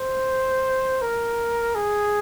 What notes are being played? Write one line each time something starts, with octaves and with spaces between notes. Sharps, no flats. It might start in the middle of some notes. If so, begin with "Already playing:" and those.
Already playing: C5
A#4
G#4